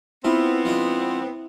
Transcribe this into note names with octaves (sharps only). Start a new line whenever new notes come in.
B3 C4 E4 F4
F3 G#3 D4